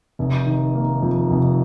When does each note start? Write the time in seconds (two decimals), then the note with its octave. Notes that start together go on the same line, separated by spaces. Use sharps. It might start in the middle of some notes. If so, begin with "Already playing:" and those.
0.19 F1
0.46 D#3
0.75 A#3
1.02 F2
1.30 F1